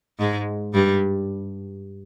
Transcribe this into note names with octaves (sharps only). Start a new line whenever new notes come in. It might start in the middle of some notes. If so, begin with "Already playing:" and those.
G#2 G#3
G2 G3